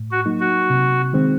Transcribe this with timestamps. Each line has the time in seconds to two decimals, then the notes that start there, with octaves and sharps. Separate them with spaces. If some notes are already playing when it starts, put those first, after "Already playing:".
Already playing: A2
0.12 F#4
0.26 F#3 A#3 D#4
0.40 F#4
0.70 C3
1.13 D#3 G#3 C4